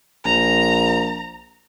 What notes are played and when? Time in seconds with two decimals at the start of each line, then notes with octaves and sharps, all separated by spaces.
0.25 A#1 A#5